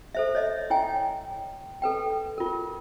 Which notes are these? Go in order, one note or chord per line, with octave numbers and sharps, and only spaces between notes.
A4 C5 E5
C#5 D#5 E5
E4 C#5 G5 G#5
A4 B4 G5
F4 A#4